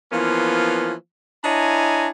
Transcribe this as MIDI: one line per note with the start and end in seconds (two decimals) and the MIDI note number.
0.12 0.93 52
0.12 0.93 53
0.12 0.93 58
0.12 0.93 59
0.12 0.93 61
0.12 0.93 65
1.44 2.09 62
1.44 2.09 64
1.44 2.09 73
1.44 2.09 75
1.44 2.09 80
1.44 2.09 82